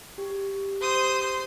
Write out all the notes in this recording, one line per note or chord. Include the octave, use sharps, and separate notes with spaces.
G4
C5 D#6